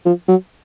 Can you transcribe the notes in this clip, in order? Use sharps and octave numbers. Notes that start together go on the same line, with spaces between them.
F3
F#3